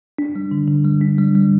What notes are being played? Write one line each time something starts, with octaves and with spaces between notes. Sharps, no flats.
D4
G3
D3
D3
G3
D4
G3
G3